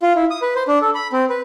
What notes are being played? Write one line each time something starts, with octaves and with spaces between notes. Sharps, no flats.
F4
E4
D#6
B4
C5
D4
A4
B5
C4
B4